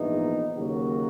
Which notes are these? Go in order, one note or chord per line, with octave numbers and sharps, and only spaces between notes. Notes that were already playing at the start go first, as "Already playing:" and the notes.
Already playing: A#1 G#2 E3 B3 D#4
D#2 C#3 F#3 A#3 F#4